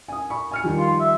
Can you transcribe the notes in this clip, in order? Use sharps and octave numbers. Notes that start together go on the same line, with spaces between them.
G#5 D#6
B5 C#6
G#5 F6 C#7
D#3 F3 G3
F4
E5